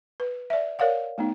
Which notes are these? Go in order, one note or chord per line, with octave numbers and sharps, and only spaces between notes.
B4
D5 E5
A#4 C#5 D5 F5 F#5
A3 B3 D#4